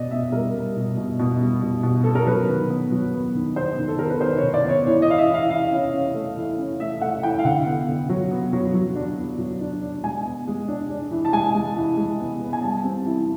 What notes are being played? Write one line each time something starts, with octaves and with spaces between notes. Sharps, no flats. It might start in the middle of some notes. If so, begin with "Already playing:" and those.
Already playing: B2 B3 D5 D#5
B2 E5
G3 A#4
G3
B2
B2
B2
G3
B2
B2
B3 A4
A#4
F#3 B4
D#3
B3
F#3
B3
D#3
B3 C5
D#3
A4
B3 A#4
B4
D#3 C5
C#5
D#3
D5
B3 C#5
E3 C#5
D#5
E3 F5
E5
E3 F5
E3 F5
C#4
C#4
A3
E3
C#4
A3 E5
A3 F#5
E3 G5
F5
D3 F#5
B3
D3
F#3
B3
F#3
F#3
D4
B3
F#3
D4
D4
G#3 G#5
B3
G#3
D4
D4
E3
A5
G#3 G#5
G#3
E3
G#3
B3
B3
G#5
G3 A5
C4
E3